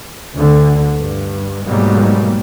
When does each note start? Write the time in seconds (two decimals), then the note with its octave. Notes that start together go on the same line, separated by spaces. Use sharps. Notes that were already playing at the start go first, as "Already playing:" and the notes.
0.37 D2 D3
0.98 G2
1.67 G#2 B2 F#3 G3 A#3